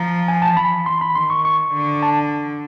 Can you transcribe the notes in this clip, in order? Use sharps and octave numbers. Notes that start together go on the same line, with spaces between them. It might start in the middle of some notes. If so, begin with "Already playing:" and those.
Already playing: F3 A#5
G#5
A5
F3 B5
E3 C6
B5
D#3 C6
C#6
C#6
D3
A5